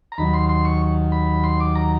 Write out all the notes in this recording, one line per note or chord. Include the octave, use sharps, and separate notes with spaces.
A#5
D#2 D#3 F#3 B5
C6
C6
C#6
B5
C6
D6
A#5